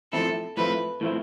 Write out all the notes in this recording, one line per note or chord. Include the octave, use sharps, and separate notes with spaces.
A2 F3 C4 E4 A4
A2 F3 C4 E4 B4
A2 F3 C4 E4